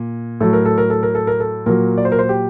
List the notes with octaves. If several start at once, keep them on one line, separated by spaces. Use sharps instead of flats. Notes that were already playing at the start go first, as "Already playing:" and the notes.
Already playing: A#2
A2 F#3 A4
A#4
A4
A#4
A4
A#4
A4
A#4
A4
A#2 F#3 A#4
D5
C5
A#4
C5
G4